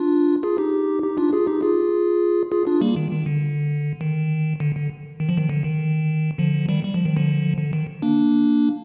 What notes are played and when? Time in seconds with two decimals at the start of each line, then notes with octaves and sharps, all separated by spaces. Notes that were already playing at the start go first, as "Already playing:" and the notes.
Already playing: D4 F4
0.43 F4 G#4
0.58 D#4 G4
1.03 D#4 G4
1.18 D4 F4
1.33 F4 G#4
1.47 D#4 G4
1.62 F4 G#4
2.52 F4 G#4
2.67 D4 F4
2.81 G3 A#3
2.96 D#3
3.11 D#3
3.26 D3
4.01 D#3
4.60 D3
4.75 D3
5.20 D#3
5.29 F3
5.37 D#3
5.50 D3
5.64 D#3
6.38 D3 F3
6.69 D#3 G3
6.84 G3
6.94 F3
7.05 D#3
7.16 D3 F3
7.58 D3
7.73 D#3
8.02 A#3 D4